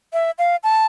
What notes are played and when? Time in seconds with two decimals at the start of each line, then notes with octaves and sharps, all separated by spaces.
0.13 E5
0.38 F5
0.63 A5